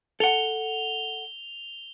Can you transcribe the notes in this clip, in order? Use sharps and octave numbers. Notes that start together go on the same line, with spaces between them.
A4 F#5 F7 G7